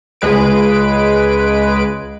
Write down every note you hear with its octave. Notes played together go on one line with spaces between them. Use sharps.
C#2 G#3 B4 D7